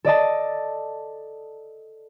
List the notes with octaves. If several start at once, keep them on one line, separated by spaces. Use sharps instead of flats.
A4 D5 D#5 A5